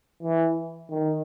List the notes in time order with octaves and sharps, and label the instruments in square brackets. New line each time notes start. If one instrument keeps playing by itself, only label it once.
[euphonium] E3
D#3